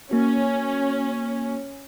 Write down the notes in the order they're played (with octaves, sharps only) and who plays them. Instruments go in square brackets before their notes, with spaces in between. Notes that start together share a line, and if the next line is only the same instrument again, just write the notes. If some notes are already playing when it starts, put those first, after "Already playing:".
[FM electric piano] A#3 F#4 [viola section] C#4